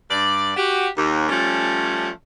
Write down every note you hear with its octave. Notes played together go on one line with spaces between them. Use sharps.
G2 D5
F#4 G4
D#2
F3 G3 A3 C#4